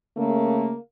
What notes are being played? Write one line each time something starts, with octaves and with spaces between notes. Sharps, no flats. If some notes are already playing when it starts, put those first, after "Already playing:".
C#3 A3 A#3